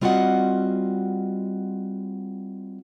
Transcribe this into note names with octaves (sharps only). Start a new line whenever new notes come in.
G3 C4 F4 F#4 D#5 F#5